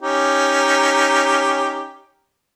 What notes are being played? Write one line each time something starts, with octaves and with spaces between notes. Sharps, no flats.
C#4 D#4 G4